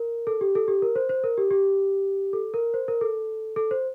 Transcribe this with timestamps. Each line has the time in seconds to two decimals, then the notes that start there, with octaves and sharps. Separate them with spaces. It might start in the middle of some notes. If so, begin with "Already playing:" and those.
Already playing: A#4
0.27 A4
0.41 G4
0.55 A4
0.68 G4
0.82 A#4
0.96 C5
1.09 C5
1.24 A#4
1.38 G4
1.51 G4
2.33 A4
2.54 A#4
2.74 C5
2.88 A#4
3.01 A4
3.56 A4
3.71 C5